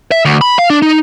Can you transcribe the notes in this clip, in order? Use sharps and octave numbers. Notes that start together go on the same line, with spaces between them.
E5
D2
B5
F5
D4
D#4